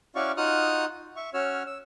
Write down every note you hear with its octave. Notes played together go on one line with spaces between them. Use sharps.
C#4 E4 F#4 D5 F5 C#6
D#4 F4 F#4 D#6 F6 F#6
E5 C#6
C#4 F#4 C#5 E6 F6
E6